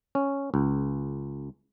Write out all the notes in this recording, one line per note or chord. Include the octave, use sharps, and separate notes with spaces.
C#4
C#2